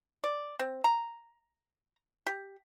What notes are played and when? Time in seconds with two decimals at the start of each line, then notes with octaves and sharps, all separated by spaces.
0.24 D5
0.59 C4
0.84 A#5
2.26 G4